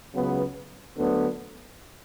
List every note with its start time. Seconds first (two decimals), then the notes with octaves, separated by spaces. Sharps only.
0.14 C#2 C#3 F#3 B3
0.97 D2 D3 F#3 B3